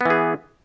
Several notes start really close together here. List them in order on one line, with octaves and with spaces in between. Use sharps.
B3 E3 G#4